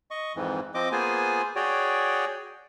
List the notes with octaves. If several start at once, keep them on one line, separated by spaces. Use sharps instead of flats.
D#5 C#6
F2 G#2 E3
F3 C4 D#5 D6
A#3 B3 F4 G#4 C5 G#5
F#4 G#4 C#5 D5 G5